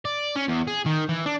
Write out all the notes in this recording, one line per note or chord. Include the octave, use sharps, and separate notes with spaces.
D5
C#4
E2
G#4
D#3
E3
D4